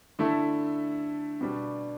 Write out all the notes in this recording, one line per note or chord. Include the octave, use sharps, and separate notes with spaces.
D3 A3 E4 A4
B2 G3 D4